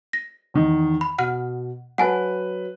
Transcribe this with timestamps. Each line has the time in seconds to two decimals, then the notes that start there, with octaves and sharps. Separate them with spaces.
0.13 A#6
0.54 E2 D#3
1.01 B5
1.18 B2 F#5 F6
1.98 F#3 B4 F#5 G#5 A5